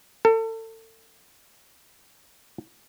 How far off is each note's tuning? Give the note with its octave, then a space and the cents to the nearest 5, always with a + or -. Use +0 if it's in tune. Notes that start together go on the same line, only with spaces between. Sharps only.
A4 +35